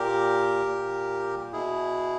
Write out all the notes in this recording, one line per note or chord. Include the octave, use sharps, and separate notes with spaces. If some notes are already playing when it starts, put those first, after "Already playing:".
Already playing: A#2 G4 A#4
A#2
B2 E4 G#4